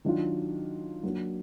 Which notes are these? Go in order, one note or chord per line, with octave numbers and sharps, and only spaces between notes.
D#3 F#3 D4 F4
F#3 A#3 D4